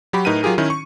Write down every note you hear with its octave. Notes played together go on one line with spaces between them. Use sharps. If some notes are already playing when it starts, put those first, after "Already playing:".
F#3 F#4 G4 B5
A2 D#4 A#4 B4 D#7
F#3 F4 G4 G#4 A#4
D#3 C#4 E4
C#6